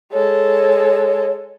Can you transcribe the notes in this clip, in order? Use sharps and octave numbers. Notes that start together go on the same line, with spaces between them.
G#3 A4 C#5